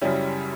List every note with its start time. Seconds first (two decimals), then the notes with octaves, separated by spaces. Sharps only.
0.01 F#2 C#3 G3 C#4 E4